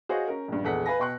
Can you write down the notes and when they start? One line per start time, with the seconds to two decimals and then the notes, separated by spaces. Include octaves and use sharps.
0.09 F#4 G#4 C5 C#5 D#5 F5
0.28 C#4 A#4
0.48 A#1 G2
0.64 A#1 E2 G#3 A4 F#5 B6
0.86 B4 F5 G#5 A#6
0.99 B2 G5 C6 C#6 F#6